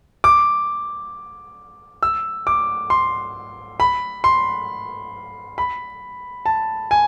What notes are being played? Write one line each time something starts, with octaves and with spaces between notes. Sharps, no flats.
D6
E6
D6
C6
B5
C6
B5
A5
G#5